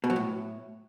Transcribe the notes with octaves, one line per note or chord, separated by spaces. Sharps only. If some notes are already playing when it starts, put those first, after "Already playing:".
B2
F#3
A2